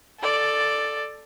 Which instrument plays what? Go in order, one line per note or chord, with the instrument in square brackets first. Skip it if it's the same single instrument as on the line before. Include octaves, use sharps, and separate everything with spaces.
[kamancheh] A4 D5